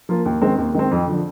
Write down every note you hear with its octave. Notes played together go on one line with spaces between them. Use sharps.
F3 A#3 F4
D#2
D#3 G#3 C4
D#2
D#3 G#3 C4
F2
D3 F3